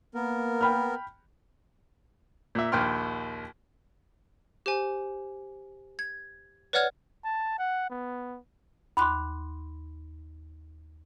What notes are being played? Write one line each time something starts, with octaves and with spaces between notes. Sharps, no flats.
A#3 B3 A#4
G5 B5 F6
A#2 E5
A#1 D#2 G5 C6 F6
G4 C5 G#5
G#6
B4 C#5 D5 F#5 F6 G#6
A5
F#5
B3
D#2 B5 C6 D6 F#6